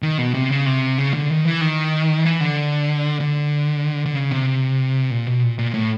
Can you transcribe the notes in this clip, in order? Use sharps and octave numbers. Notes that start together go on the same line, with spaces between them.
D#3
B2
C3
C#3
C3
C#3
D3
D#3
E3
D#3
E3
D3
D3
D3
C#3
C3
A#2
B2
A#2
A#2
A2